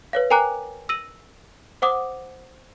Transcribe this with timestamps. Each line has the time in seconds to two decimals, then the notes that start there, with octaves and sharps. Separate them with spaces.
0.13 B4 C#5 F5
0.30 A#4 G5 G#5 A#5 D6 F#6
0.89 E6 A#6 D#7 F#7
1.82 C5 F#5 D6 D#6